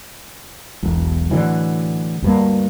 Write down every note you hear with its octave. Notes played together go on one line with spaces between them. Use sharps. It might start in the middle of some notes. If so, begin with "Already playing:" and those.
E1 B1
A2 D3 E3 F#3
D2 G2 A#3